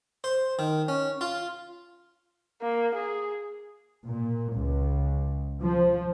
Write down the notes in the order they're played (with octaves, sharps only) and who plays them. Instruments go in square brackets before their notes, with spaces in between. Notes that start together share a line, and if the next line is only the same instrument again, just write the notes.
[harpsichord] C5
D#3
C#4
F4
[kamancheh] A#3
G#4
[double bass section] A#2
C#2
F3